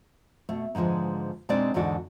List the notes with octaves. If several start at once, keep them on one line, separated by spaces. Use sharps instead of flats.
B2 A3
G#2 D3 F3 G#3 B3
B2 G#3 C4 D4 D#4 D5
E2 G#2 D3 D#4 F#4 D5